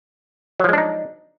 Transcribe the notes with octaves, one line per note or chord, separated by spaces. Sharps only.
F3 F#3 G#3 D4 D#4